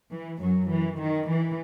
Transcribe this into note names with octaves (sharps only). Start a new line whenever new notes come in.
E3
F#2 F#3
E3
D#3
E3